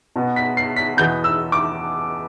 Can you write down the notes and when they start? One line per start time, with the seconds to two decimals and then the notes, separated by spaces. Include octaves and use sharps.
0.16 B2 B3
0.36 B6
0.57 C7
0.76 B6
0.97 E2 B2 B3 G6
1.24 E6
1.52 D6